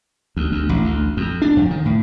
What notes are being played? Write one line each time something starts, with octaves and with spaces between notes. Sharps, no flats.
D2
D2
A1
D2
F2
D4
F2
D#3
A2